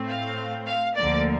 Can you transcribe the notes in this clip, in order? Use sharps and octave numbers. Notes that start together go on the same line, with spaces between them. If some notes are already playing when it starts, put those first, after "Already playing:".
Already playing: A2 A3 C4
F5
F5
D2 D3 F3 A#3 D5